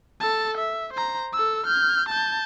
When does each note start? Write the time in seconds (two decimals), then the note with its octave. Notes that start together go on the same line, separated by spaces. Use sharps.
0.20 A4 A5
0.57 E5
0.93 C5 A#5
1.33 A4 E6
1.66 F6 G6
2.09 A5 G6